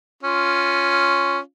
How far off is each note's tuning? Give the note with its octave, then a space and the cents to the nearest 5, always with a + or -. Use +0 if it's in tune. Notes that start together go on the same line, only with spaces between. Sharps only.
C#4 +0 F4 +0